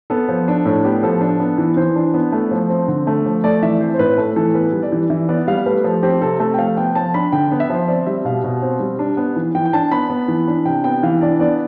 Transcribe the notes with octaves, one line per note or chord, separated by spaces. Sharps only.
B3 A4
F3
D4
A2 A4
B3 G4
F3 A4
D4
B3
E3
E3 C5
D4
B3
A3
F3
C4
D3
A3
F3
A3 D5
E3 E5
C4 C5
C5
A2 B4
A3
E3 A4
B3 B4
G3
D5
E3
E3 E5
B3 D5
G3 F5
A3 B4
F3 A4
C4 G4
G4
C3 A4
A3 A4
G5
F3 F5
B3 G5
F3 A5
D4 B5
D3 G5
B3
E5
F3 C5
C4 D5
G3 E5
B2 F5
B2
C4
G3
D4
B3
E3
E3 G5
G5
D4 A5
B3 B5
B3
E3
D4
C3 G5
B3 G5
E3 F5
D4 D5
B3 D5